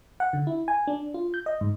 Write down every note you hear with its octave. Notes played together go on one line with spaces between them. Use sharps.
F#5
D3
E4
G#5
D4
F4
G6
D#5
G#2